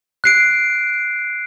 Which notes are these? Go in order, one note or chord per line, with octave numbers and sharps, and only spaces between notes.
F#6 C7 D7